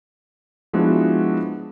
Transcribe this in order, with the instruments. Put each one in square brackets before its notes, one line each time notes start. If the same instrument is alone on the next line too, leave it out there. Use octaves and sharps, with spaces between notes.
[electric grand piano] F3 G#3 B3 D4 E4 F#4